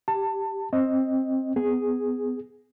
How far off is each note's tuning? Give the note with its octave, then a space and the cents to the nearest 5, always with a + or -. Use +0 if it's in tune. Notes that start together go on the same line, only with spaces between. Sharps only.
G4 +0 A5 +25
C4 +15 D#5 +5
B3 +25 G#4 +0